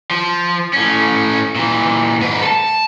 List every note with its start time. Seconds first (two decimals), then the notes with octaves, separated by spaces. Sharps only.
0.11 F3
0.73 A2 C#4
1.56 A#2 E3
2.20 G#2 B4
2.42 A4 A5